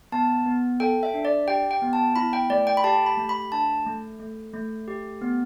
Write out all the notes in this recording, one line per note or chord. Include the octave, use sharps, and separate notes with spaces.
B3 A5
B3
A4 G5
E5
D4
D5
G4 G5
G5
B3
A5
E4 B5
G5
A3 D5
G5
B5
G4 A5
B5
A3
B5
D4 A5
A3
A3
A3
G4
B3